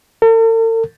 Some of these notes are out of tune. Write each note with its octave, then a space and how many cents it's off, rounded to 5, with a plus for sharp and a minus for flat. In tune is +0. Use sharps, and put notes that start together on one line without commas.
A4 +45